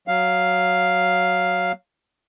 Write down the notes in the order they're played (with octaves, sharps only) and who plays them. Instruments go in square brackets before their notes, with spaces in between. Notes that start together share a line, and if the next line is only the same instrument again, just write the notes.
[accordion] F#3 F5